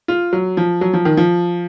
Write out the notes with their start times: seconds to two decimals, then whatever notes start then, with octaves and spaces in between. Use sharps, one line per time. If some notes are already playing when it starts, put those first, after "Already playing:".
0.08 F4
0.33 F#3
0.57 F3
0.81 F#3
0.93 F3
1.05 D#3
1.17 F3